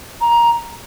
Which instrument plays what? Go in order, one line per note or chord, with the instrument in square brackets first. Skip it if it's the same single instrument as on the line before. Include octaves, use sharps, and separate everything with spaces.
[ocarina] A#5